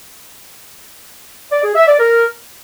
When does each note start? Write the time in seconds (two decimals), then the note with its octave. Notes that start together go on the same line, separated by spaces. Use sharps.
1.51 D5
1.63 G#4
1.75 E5
1.87 D5
1.99 A#4